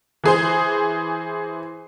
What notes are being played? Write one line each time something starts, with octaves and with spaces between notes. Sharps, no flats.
E3 G#4 C5